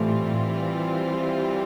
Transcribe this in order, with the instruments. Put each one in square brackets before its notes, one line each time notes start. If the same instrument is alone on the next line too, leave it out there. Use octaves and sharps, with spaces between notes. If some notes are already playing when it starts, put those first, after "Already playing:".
Already playing: [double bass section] A2 [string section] E3 G3 C4 F4